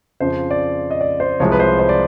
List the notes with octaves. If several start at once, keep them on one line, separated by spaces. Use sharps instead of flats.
F2 C#3 F3 C5
D5
D#5
D5
C5
C2 C3 F3 G#3 C#5
B4
C5
C5
D5